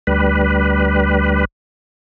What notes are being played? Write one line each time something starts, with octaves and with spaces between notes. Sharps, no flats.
D2 G3 B4